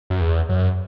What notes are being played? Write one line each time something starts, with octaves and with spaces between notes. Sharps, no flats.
F#2
E2
F#2